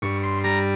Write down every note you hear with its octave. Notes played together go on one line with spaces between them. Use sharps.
G2 C#6
C6
G3 A#5